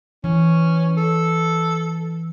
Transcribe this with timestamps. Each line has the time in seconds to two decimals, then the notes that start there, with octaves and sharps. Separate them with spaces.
0.24 E3 C#4
0.97 A4